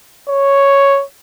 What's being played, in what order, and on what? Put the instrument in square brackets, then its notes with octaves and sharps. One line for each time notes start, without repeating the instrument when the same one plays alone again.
[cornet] C#5